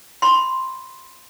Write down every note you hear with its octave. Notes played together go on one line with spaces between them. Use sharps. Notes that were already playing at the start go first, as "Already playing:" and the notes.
B5 C6